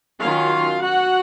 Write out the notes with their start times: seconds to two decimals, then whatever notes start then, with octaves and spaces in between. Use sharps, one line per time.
0.20 D#3 F#3 C#4 F4 F5
0.83 F#4 F#5